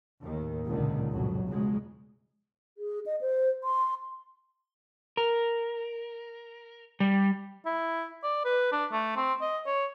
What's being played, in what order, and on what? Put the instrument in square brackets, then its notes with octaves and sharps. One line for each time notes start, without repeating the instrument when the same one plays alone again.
[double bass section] D#2 A2 D#3
C#2 A#2 D3 D#3
C2 F2 A2 F#3
B1 E2 C#3 F3 F#3 G#3
[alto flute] G#4
D#5
C5
C6
[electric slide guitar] A#4
G3
[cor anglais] E4
D5
B4
D4
A3
C4
D#5
C#5